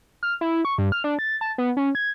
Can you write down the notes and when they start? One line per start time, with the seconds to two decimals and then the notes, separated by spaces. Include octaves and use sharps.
0.23 F6
0.41 E4
0.65 C#6
0.78 G2
0.92 F6
1.04 D4
1.19 A6
1.41 A5
1.58 B3
1.77 C#4
1.95 G#6